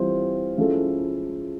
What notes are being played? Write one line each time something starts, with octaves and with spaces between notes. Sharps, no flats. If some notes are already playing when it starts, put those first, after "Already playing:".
Already playing: E3 G3 C4 F4
F3 G#3 C#4 E4 A4